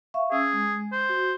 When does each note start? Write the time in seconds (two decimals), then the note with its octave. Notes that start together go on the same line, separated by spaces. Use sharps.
0.14 E5 F5 C#6
0.32 C#4 G#4 E6
0.53 G#3
0.92 C5
1.09 F#4